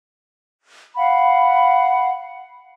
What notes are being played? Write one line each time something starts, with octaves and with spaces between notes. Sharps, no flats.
F5 F#5 B5